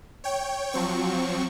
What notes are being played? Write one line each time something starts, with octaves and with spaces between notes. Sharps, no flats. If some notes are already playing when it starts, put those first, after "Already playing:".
C#5 G5
F3 F#3 C4 C#6